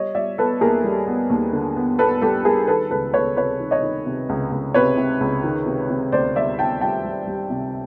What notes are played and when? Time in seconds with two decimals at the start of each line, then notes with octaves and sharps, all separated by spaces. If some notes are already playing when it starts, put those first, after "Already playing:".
Already playing: G3 C#5 D#5
0.15 G3 D5 E5
0.38 B3 A4 B4
0.61 D#2 G#4 A#4
0.84 G3
1.07 B3
1.30 D#2
1.53 D3
1.76 B3
1.99 B3 A4 B4
2.21 G3 G4 A4
2.45 G3 G#4 A#4
2.67 D#3 A4 B4
2.91 C#2 A4 B4
3.13 C#2 B4 C#5
3.36 C3 B4 C#5
3.59 D#3
3.71 C#5 D#5
3.82 D#3
4.06 C3
4.29 C#2
4.52 C#2
4.74 C3 B4 C#5
4.97 C3
5.21 C#2
5.44 D#3
5.66 C3
5.89 C3
6.12 D2 C5 D5
6.36 G3 D5 E5
6.58 D#3 G5 A5
6.81 G3 G5 A5
7.04 G3
7.27 G3
7.50 C3